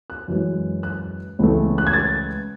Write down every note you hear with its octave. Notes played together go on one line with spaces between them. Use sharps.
F#6
F#2 E3 G#3
F#6
C#2 C#3 E3 A3
F#6
G#6
A6